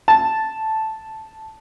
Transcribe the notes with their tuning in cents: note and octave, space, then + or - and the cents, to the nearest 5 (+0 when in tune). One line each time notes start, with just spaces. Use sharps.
A5 -5